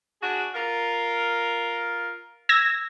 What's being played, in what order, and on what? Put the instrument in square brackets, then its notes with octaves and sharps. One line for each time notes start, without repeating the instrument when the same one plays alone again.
[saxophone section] D4 F#4 G#4
F4 A#4
[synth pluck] E6 G#6 A#6